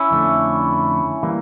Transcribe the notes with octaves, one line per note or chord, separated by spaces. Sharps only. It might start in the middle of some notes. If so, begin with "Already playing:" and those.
Already playing: C#4 E4
F2 D3 A3
E3 G3 A#3